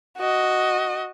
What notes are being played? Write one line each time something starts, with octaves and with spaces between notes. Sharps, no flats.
F#4 D#5